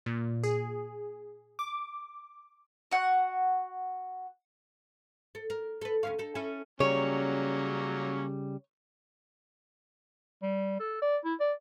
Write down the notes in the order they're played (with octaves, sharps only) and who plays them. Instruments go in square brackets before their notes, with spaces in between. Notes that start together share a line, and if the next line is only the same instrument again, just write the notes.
[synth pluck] A#2
G#4
D6
[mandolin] F#4 F#5
[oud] A4
A#4
A4 B4
D2 C#4 F5
D#4 A4
C#4 E4 A4
[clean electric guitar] C#3 G3 [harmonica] F#3 A#3 C#4 [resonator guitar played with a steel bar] C#5
[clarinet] G3
A4
D5
E4
D5